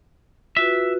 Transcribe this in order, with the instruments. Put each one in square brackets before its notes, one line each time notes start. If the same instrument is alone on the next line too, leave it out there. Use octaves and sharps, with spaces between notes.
[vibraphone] F4 F#4 B4 [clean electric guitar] E5